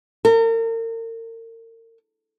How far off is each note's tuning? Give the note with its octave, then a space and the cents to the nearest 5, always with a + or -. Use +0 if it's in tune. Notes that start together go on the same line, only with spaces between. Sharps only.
A#4 -40